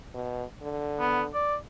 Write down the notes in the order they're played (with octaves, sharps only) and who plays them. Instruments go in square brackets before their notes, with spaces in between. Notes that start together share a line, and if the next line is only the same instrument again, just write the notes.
[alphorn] B2
D3
[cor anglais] B3
D5